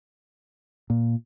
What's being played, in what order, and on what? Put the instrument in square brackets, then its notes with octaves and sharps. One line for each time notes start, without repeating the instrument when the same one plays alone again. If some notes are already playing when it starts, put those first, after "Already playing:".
[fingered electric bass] A#2